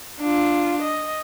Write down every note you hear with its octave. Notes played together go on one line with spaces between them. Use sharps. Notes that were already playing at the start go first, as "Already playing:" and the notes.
D4 F4
D#5